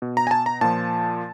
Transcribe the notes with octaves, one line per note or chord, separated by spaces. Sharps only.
B2
A#5
G#5
A5
A#5
A#2 F3 A5